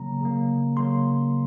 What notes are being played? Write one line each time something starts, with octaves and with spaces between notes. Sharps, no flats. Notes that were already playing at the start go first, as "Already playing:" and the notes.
Already playing: C#3 F#3 A#3 A#5
C#3 F#3 A#3
C#3 F#3 A#3 C6